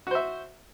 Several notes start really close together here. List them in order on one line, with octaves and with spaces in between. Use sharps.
F#4 C5 E5